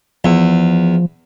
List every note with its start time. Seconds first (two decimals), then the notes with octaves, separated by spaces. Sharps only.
0.25 E2 F3